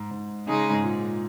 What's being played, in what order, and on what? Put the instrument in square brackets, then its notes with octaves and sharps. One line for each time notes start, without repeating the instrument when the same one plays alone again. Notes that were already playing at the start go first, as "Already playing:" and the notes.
Already playing: [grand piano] G#2
G#2
[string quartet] C#3 G#3 D#4 G#4
[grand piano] G#2
A#2